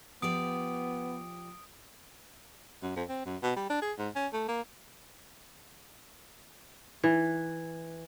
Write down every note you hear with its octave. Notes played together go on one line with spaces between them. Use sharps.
F3 B3 G4 D5 D#6 D7
F#2
F2
C4
F#2
B2
G3
D4
G#4
G#2
C#4
A3
A#3
E3